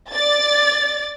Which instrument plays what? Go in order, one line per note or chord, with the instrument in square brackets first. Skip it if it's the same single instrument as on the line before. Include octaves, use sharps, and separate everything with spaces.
[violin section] D5 A6